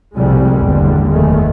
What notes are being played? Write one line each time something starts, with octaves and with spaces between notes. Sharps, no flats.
C2 F2 A2 C3 G3 G#3
G#1 E2 A#2 D3 G3
F#1 E2 D#3 G#3 A3